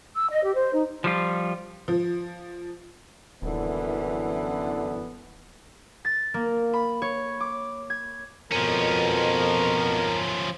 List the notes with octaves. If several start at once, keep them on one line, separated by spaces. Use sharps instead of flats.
E6
D#5
G4
C5
D#4
F3 G3 F4
F3
D#1 F#2 D3 E3 B3
A6
A#3
B5
C#5
D6
G#6
F2 B2 F3 C#4 A#4